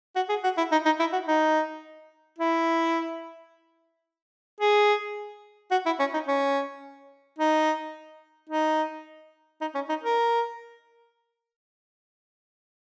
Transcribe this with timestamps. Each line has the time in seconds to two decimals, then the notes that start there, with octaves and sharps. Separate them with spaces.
0.16 F#4
0.29 G#4
0.44 F#4
0.58 E4
0.72 D#4
0.85 D#4
1.00 E4
1.13 F#4
1.27 D#4
2.38 E4
4.61 G#4
5.71 F#4
5.86 E4
6.00 C#4
6.14 D#4
6.28 C#4
7.39 D#4
8.50 D#4
9.61 D#4
9.75 C#4
9.89 D#4
10.03 A#4